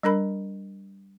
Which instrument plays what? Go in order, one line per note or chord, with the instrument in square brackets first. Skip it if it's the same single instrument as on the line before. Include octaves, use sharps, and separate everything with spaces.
[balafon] G3 D4 A#4 B5